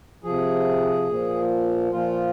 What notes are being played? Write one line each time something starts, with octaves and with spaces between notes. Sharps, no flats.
C3 F3 G#4
A#2 F3
A#2 F3 F4